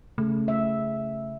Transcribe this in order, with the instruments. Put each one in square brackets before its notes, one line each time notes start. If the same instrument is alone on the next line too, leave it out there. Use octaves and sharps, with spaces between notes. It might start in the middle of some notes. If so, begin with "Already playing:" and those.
[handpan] C#3 [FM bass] A3
[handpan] E5